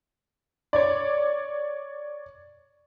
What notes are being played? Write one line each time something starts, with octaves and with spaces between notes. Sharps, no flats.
C#5 D5